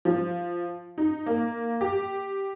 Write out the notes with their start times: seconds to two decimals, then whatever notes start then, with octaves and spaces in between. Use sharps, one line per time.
0.05 F3
0.98 D#4
1.26 A#3
1.81 G4